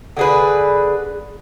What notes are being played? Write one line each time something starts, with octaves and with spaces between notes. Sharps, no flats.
D3 G#4 B4